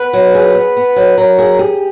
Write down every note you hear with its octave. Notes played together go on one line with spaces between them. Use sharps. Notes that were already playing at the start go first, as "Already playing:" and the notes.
Already playing: B3 B4
F#3
G#4
B3
B3
F#3
F#3 A#4
G#4
G4 G#4